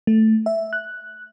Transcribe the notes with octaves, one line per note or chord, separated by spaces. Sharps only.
A3
E5
F#6